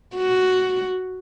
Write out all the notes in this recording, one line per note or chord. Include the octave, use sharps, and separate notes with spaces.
F#4